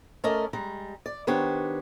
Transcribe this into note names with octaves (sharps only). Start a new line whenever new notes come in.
A3 C#4 A4 A#4 D5 D#5
G3 G#3 A#5
D5
D#3 B3 D4 G4 C5 C#5